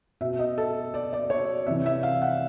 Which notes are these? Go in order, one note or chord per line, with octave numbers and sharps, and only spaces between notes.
B2 E5
D#5
A4
D5
D5
C#5
C3 E3 E5
E5
F5
F#5